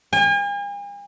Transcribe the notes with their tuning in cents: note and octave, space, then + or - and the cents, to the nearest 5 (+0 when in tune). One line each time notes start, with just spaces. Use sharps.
G#5 -45